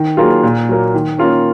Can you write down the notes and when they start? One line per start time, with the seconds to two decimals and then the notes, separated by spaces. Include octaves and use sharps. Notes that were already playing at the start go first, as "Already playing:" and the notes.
Already playing: D#3
0.17 F#3 A#3 F4 G#4
0.43 A#2
0.69 F#3 A#3
0.94 D#3
1.18 A#3 C#4 F4 A#4